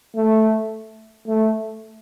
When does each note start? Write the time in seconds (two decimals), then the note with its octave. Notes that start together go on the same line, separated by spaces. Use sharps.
0.16 A3
1.28 A3